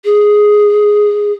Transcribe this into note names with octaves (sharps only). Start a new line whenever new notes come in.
G#4